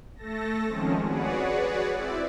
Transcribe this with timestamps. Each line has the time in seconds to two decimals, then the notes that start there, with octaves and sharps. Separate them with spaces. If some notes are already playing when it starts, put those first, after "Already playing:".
0.16 A3 A4 A5 A#6
0.66 D#3 F3 G#3 C4 C#4
1.04 F#4 G#4 B4 C#5 D5 F#5
1.95 C4 E4 D5 E5